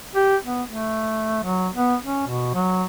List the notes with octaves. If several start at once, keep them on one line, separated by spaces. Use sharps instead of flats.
G4
B3
A3
F#3
B3
C#4
B2
F#3